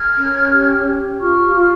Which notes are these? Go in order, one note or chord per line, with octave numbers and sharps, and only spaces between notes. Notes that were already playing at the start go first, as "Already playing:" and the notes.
Already playing: F6 G#6
C#4
G4
G4
F4 C#6 F6
F4